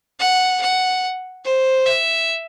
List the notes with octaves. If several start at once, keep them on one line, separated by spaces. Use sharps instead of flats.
F#5
F#5
C5
E5